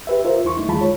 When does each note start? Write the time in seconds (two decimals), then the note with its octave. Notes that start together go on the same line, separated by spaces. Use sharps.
0.07 G4 B4 E5
0.25 F4 A#4 C5 E5
0.44 E2 E4 C6 C#6
0.56 A3 D#4 E4
0.68 E2 D#3 G#3 F4 A5 B5
0.81 C#5